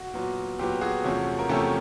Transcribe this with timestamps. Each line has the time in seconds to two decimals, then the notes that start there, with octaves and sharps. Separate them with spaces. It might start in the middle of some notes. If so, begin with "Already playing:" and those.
Already playing: F#4
0.14 A#2 F#3 B3
0.59 A#2 F#3 B3 G4
0.81 F#4 G#4
1.04 E2 C3 F3 A3 C#4
1.39 A#4
1.49 E2 C3 F3 A3 C#4 G4 A4